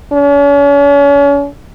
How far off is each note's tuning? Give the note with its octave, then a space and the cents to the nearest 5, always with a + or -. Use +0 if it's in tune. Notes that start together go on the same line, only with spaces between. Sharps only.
C#4 +40